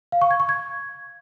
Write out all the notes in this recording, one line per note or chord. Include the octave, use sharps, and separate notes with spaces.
F5
C#6
G#6
C#6
G#6